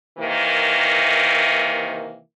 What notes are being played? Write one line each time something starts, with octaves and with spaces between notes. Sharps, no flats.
C3 D#3 E3 A#3